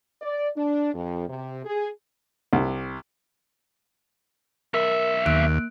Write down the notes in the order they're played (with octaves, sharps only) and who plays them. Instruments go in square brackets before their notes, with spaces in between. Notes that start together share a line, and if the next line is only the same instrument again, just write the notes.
[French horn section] D5
D4
F2
C3
G#4
[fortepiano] C2
[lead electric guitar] B1 E5 [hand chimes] A#4
[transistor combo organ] D#2 [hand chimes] A#3 F#6 D7